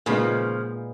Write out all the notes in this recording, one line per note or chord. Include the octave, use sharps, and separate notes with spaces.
A#2 C#3 F3 G#3 B3 D#4